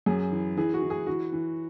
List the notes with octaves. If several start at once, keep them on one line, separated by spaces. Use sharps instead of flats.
F#2 G#4
E3
E3 G#4
F#4
E3
G#4
E3 F#4
E3